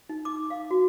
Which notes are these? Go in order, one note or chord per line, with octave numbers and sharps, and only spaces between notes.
D#4
D6
F5
F#4